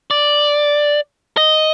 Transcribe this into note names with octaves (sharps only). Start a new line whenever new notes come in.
D5
D#5